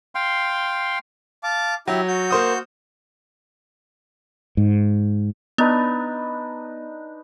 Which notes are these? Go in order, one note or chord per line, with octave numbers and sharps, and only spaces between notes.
F5 G5 C6
F5 A5 D6
F#3 E4 G4
F#4 G6
A#3 C5 D#6
G#2
B3 D4 D#4 B4